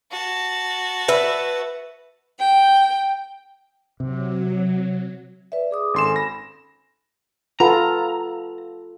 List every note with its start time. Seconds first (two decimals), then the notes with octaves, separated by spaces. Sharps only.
0.11 F#4 A5
1.08 B4 E5
2.38 G5
4.00 C3 F#3
5.52 B4 D5 E5
5.71 G#4 D6 D#6
5.94 G#1 C#4 A4 G#5 C6 E7
6.16 B5 A#6
7.60 F4 A4 B4 F#5 A#5 B5